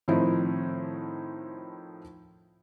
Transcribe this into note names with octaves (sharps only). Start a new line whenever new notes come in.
A2 D#3 F3 C4 D#4 E4